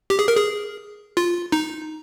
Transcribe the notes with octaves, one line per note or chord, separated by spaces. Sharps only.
G4
G#4
A#4
G#4
F4
D#4